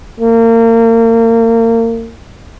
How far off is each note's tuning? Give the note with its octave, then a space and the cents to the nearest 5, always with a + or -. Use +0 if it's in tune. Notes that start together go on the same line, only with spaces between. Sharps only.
A#3 -30